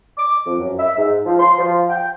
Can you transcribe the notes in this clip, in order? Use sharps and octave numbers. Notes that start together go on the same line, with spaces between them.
D6
F2
F#2
E5
G#2
F3
C6
F3
G5